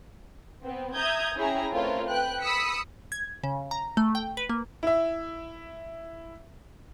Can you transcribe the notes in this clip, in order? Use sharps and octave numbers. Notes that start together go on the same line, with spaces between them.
B3 C4
E5 A#5 D#6 G6 G#6
C#4 E4 G#4 G5 A#5
A3 C4 F4 A#4 B4 C#5
B4 G5 F#6
B5 D#6 E6 B6 C#7
G#6
C#3
A#5
A3
G5
B4
A#3
E4 E5